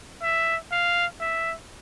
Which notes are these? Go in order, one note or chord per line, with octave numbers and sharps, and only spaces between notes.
E5
F5
E5